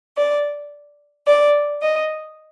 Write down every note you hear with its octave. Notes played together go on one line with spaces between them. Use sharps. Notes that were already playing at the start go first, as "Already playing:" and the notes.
D5
D5
D#5